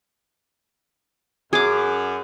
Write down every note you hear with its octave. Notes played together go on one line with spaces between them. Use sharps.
F#2 G#4 D6